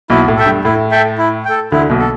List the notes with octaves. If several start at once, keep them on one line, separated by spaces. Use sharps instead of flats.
B1 B2 E4
A2
A4 E5 G5
G2
A2 E4
A4 E5 G5
E4
A4 G5
D2 D3 E4
B1 B2
A4